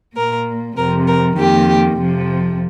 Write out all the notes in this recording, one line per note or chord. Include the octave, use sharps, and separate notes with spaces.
A#2 A#3 A#4
F2 C3 F3 A#4
A#4
F2 D#3 A#3 G4
F2 C3 F3